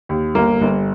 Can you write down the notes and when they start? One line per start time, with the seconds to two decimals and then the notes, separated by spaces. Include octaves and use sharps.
0.09 D#2
0.35 G1 A#3
0.61 G1